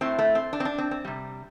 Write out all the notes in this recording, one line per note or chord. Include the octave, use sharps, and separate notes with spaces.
A2 A3 C4
A3
C4
D4
C4
D4
C4
C4
C3 G3